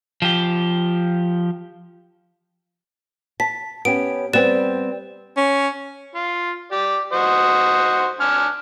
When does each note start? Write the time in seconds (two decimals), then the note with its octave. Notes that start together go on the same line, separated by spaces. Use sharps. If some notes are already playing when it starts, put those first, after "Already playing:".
0.22 F3 G4
3.40 A5 B6
3.85 B3 C#4 G4 D7
4.33 G3 B3 C4 B4 D5 E7
5.37 C#4
6.15 F4
6.72 G4 D5
7.13 F#4 C5 D#5
8.20 D4 G#5 F6